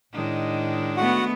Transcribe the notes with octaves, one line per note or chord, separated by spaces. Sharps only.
A2 D#3 G#3 D4
A3 B3 F#4 F#5